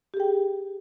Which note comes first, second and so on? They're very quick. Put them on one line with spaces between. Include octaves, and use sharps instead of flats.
G4 G#4 G5